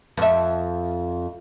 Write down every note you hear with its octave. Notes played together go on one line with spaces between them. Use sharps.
F2 E5